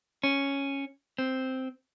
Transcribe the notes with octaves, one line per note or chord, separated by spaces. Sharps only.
C#4
C4